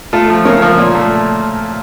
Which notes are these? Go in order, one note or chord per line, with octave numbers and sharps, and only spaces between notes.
A3 F4 A4
F3
C#3 A#4 C#5
F3 A#4 C#5
A#2
A3